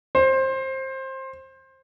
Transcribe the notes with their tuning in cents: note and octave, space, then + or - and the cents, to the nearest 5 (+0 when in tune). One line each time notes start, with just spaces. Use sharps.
C5 +20